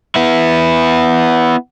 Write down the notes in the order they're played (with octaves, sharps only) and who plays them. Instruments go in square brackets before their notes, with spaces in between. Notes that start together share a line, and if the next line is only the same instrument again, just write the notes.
[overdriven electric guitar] B3 E4